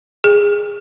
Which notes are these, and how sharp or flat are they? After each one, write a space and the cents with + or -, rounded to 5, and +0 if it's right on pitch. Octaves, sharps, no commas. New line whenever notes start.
G#4 -10